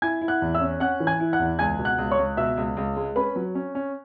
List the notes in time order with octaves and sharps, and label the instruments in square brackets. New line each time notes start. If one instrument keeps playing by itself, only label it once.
[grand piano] E4 G#5 G#6
E4
F#5 F#6
E2
E5 E6
C#4
C#4 F#5 F#6
E3
G#5 G#6
E4
F#5 F#6
E2
C#2 G#5 G#6
B2
F#5 F#6
C#2
C#5 C#6
C#2
B2 E5 E6
C#2
C#2
G#3
C#4 B4 B5
F#3
C#4
C#4